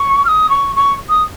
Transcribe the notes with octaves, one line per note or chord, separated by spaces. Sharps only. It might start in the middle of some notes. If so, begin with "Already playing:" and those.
Already playing: C#6
F6
D#6
C#6
C#6
D#6